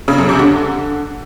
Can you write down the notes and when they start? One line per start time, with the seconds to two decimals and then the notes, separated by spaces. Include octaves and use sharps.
0.08 C#3
0.18 F#2
0.29 C3
0.39 D3